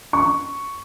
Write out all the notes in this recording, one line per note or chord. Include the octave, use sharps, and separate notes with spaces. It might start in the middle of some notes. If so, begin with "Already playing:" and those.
C#6